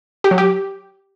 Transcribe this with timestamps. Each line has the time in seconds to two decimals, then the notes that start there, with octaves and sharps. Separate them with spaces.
0.24 G4
0.31 F#3
0.38 G4